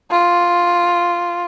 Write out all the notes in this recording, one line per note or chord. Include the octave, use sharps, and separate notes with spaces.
F4